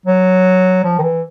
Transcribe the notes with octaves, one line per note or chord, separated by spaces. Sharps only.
F#3
F3
D#3
E3